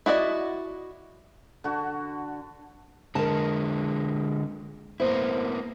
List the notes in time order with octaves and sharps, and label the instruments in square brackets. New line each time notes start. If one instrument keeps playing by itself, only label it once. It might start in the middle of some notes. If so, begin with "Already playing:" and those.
[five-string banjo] E4 F#4 D5 D#5
[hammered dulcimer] D3 F#4
[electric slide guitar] D3 G#3 [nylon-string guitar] A#4 A5
[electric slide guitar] A#3 B3 E4 [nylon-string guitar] C5